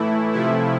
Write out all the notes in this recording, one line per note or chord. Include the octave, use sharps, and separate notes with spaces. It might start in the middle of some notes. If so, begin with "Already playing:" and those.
Already playing: A2 E3 A3 E4
C3 F3 A3 E4